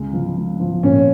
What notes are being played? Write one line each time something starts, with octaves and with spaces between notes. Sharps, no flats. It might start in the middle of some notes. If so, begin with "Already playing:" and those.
Already playing: C#2 G#3
F3
G#3
F3
A#2 C#4